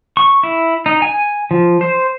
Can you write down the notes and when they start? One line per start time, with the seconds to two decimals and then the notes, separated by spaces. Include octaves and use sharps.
0.17 C#6
0.43 E4
0.86 D#4
1.02 G#5
1.51 F3
1.81 C5